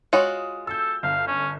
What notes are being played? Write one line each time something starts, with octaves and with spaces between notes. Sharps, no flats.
G#3 F4 F#4 C#5 D#6
A4 E6 G6
G1 F5
C#4